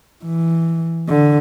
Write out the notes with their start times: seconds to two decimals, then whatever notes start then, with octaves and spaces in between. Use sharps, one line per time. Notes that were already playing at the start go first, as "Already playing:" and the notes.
0.25 E3
1.09 D3